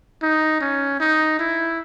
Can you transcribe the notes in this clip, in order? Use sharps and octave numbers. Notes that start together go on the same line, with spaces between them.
D#4
C#4
D#4
E4